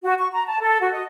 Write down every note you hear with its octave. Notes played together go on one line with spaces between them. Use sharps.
F#4
C#6
A#5
A5
A4
F#4
D#5